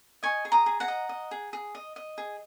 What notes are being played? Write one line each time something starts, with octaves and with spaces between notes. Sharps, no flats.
D#5 G#5 C#6
G#4
A#5 D#6
G#4
F#5 A#5
D#5
D#5
G#4
G#4
D#5
D#5
G#4